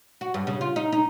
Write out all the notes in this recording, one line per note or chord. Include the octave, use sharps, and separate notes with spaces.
F#4
G2
C#3
F4
D#4
D#4